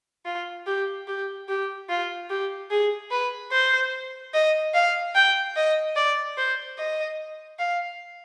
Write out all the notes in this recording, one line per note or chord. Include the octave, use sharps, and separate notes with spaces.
F4
G4
G4
G4
F4
G4
G#4
B4
C5
D#5
F5
G5
D#5
D5
C5
D#5
F5